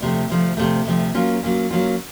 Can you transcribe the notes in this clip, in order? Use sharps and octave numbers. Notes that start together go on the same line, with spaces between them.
D2 C3 F3 A3
D2 C3 F3 A3
D2 C3 F3 A3
D2 C3 F3 A3
F#3 A#3 C#4 F4
F#3 A#3 C#4 F4
F#3 A#3 C#4 F4